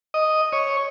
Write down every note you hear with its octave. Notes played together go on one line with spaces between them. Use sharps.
D#5
C#5